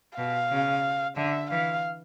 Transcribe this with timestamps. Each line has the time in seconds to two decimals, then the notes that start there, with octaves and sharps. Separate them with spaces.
0.18 B2 F5
0.51 C#3
1.17 D3 E5
1.50 E3 F5